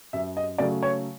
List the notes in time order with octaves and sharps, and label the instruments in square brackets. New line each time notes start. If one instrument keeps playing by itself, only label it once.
[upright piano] F#2 E5
D#5
C#3 F#3 A3 D5
C#5